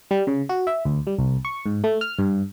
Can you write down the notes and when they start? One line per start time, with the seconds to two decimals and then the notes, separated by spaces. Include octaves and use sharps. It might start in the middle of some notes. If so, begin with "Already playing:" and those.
0.11 G3
0.27 C#3
0.49 F#4
0.67 E5
0.85 D2
1.07 G3
1.19 C2
1.45 C#6
1.66 G#2
1.84 A3
2.01 F6
2.19 G2